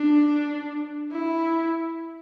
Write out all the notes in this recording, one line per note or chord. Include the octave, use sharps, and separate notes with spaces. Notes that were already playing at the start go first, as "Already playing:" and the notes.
Already playing: D4
E4